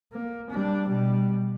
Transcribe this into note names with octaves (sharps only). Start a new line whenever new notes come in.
A#3
G3 D4
B2 G3